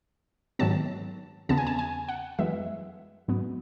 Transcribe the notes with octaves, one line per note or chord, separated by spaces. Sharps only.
G#2 D#3 F#3 B3 A5
E2 C#3 E3 B3 A5
G#5
A5
G#5
F#5
F#2 E3 G#3 B3 E5
G#2 F#3 B3